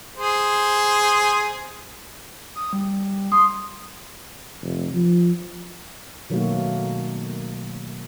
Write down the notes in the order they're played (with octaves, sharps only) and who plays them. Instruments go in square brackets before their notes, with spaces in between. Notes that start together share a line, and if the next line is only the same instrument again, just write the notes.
[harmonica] G#4 C5
[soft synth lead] D#6
G3
[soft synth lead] C6 [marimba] D#6
[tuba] F1
F3
[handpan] B2 D#3 F#3 A3 A#3 F#4